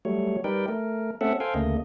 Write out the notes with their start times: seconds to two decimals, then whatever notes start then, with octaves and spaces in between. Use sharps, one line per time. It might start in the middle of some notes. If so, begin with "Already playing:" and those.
0.05 F#3 G3 A3 C#5
0.44 G3 D#4 A#4 B4 D5 G5
0.68 A3 A#4
1.21 A3 C4 C#4 A4 E5 F#5
1.40 A4 C5 F5 G5 G#5
1.54 D2 C#3 A3 A#3 D#5